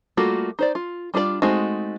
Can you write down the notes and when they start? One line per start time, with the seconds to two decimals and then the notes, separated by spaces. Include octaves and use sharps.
0.17 G3 A3 A#3 F4 F#4
0.59 D#4 C5 D5
0.75 F4
1.14 G3 D4 F4 F#4 D5
1.42 G#3 A3 C4 D#4 F#4